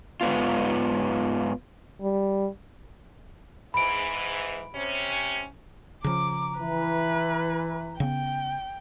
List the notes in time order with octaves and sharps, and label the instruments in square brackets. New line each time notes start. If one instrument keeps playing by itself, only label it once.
[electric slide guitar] G#2 B3 F4
[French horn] G3
[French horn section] G#2 E3 [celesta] B5 D7
[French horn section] C3 C#4
[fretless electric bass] C#3 F3 [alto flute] A#5 [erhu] D6
[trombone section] E3 [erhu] B4
[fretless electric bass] C#3 B3 [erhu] G5